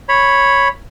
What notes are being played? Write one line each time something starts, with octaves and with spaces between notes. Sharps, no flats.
C#5 B5